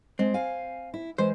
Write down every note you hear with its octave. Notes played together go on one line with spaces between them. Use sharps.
G#3 C4
F5 G#5
E4
E3 G#3 C5